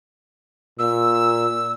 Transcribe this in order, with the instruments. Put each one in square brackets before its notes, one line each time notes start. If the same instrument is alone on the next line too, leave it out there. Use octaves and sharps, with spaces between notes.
[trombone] A#2 [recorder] E6